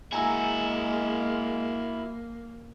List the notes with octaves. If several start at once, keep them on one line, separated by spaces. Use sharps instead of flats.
G#3 A#3 E4 F#4 G#5 A#5 E6